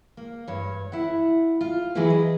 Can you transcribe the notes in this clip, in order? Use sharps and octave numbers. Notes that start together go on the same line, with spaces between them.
A#3
G2 C#5
E4 F#5
F4
E3 F#3 G3 E4 G#4 B4
D#5